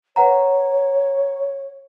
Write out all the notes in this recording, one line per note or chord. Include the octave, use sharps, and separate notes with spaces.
B4 C#5 F#5 A#5